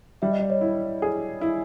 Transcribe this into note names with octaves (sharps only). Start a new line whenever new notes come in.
G3 E5
D#5
D5
C#5 D#5
E4
G#4
E4